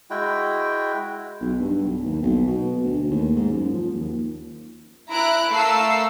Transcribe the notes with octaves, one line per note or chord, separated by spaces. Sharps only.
G#3 E4 F#4 G5
B1
G2
B1
D#2
B1
B2
D2
D#2
G#2
F#2
F3
D#2
E4 A#5 F#6 D7
A3 A4 A#4 F5 E6 C7